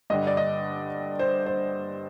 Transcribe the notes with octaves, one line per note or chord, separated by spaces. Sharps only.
G2 D3 G3 D4 D#5
D5
D#5
C5
C5